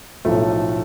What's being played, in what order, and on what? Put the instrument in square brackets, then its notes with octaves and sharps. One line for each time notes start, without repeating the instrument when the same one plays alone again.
[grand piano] B1 A2 F3 A3